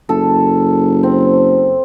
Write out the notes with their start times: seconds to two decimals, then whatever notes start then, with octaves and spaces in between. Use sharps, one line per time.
0.09 F#1 A4
1.03 C4